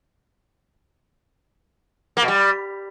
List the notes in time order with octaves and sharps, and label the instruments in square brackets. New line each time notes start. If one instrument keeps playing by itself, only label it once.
[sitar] A#3
B2
G3